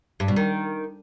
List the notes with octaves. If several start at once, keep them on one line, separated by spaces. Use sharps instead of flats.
G2
B2
D#3